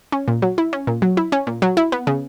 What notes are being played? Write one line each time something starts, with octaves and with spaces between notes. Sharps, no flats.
C#4
A#2
F#3
E4
C#4
A#2
F#3
E4
C#4
A#2
F#3
E4
B3
C#3